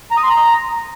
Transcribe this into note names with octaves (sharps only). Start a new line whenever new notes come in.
A#5
D#6
C6
A#5